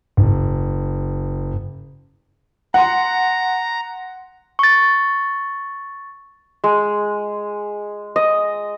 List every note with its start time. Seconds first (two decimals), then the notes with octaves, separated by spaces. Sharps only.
0.17 F#1
2.74 F#5 A#5 C6
4.59 C#6 A6
6.64 G#3
8.16 D#5